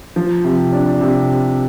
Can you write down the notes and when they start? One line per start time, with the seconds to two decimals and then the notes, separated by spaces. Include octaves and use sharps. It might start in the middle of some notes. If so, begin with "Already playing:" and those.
0.16 F3
0.44 C3
0.73 D4
1.01 C3